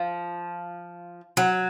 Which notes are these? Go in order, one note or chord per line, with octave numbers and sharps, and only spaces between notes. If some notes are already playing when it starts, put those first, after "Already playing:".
Already playing: F3
F#3